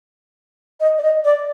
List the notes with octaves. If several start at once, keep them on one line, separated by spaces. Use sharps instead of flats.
D#5
D5
D#5
D5